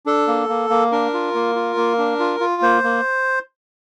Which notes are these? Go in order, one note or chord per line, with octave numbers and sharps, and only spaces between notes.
D4 A4
A#3
A#3
A#3
D4 A#4
F4
A#3
F4
A#3
D4
F4
F4
A#3 C5
A#3